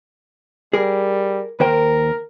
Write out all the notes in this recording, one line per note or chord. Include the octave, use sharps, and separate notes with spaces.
G3 G#4 A#4
D#2 A#4 C5 G5